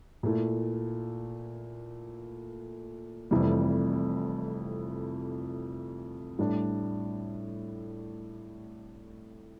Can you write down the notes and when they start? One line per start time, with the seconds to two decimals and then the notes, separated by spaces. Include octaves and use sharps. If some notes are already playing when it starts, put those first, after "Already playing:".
0.23 A#2 A3 E4
3.31 F1 F2 C3 E3 G3
6.39 A2 G3 D4